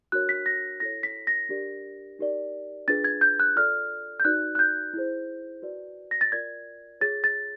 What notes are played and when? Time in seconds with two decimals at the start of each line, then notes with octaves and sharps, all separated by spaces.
0.12 D4 F#4 A#4 C#5 F#6
0.29 B6
0.46 A#6
0.80 E4 A4 C#5 A#6
1.03 B6
1.27 A#6
1.49 D4 G4 A#4 D5
2.19 D#4 G4 A#4 D5
2.88 D4 F4 G#4 B4 A6
3.04 G#6
3.21 G6
3.40 F#6
3.56 F4 A4 D5 F6
4.20 G6
4.25 D#4 F#4 B4 D5 F#6
4.55 F#6
4.59 G6
4.94 E4 G#4 C5
5.62 F#4 B4 D5
6.11 A#6
6.21 A6
6.32 F4 A#4 D5 G#6
7.01 F4 G#4 C#5 A6
7.24 A6